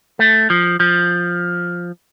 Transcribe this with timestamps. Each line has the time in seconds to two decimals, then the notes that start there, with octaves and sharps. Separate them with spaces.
0.19 A3
0.50 F3
0.80 F3